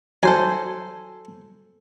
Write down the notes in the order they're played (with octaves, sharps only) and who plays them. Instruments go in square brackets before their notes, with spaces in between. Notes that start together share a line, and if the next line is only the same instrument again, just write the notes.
[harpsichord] F#3 [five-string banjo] A4 C5 G#5